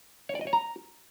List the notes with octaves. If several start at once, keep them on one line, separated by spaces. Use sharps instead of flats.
C#5
D5
D#5
C#5
A#5